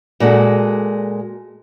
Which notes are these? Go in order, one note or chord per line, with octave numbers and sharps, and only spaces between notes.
A#2 G#3 F#4 A4